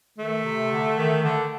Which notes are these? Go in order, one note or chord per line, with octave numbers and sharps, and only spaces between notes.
D#3 A3
C3
D3
D#3
D3